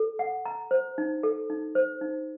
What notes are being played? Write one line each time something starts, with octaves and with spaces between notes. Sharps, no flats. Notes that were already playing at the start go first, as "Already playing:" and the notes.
Already playing: A4
F#5
A#5
C5
D#4
A4
D#4
C5
D#4